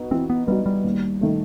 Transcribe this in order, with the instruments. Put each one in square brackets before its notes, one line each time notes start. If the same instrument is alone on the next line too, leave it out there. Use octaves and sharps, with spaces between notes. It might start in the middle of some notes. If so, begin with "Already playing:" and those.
Already playing: [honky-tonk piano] B3 D#4 F#4
[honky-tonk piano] E3 [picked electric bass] C4
[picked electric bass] B3
[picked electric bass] G3 [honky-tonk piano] B3 D#4 F#4
[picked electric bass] G3
[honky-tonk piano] D#2
D#3 A3